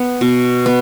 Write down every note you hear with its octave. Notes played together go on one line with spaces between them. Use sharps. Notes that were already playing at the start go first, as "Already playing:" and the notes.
Already playing: B3
B2
B3